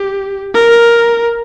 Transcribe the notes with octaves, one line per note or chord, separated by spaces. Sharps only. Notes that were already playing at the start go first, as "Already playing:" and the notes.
Already playing: G4
A#4